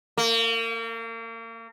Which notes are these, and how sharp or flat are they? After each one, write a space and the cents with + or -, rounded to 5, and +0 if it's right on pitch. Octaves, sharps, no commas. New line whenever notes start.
A#3 -35